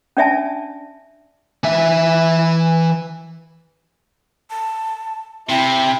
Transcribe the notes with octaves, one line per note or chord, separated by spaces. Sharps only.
C#4 D4 D5 E5 G#5 A5
E3 E5
A5
C3 E4 G5